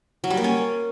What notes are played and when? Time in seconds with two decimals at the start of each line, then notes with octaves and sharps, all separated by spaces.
0.24 F#3
0.30 G3
0.37 A#3
0.44 C#4